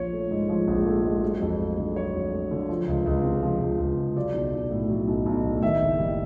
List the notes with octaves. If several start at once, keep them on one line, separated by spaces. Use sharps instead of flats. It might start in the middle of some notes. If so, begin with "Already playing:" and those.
Already playing: A#1 F3 C#5
A3
G#2
F3
A#1
A3
G#2
F#3
F2
A3
D3
F#3 C#5
F2
A3
D3
F3
C#2
C#2
C3
F3
C#2
C#2
C3
F#3 D5
B1
B1
A2
F#3
B1
B1
A2
D#3 E5
F#1
G3